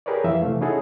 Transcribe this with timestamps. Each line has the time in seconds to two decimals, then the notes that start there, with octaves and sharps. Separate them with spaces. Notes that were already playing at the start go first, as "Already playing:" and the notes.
0.06 G4 G#4 A#4 B4 C#5 D5
0.24 F2 E3 E5 F5
0.42 C3 E3 A3
0.61 C#4 D#4 E4 F#4 G#4 A4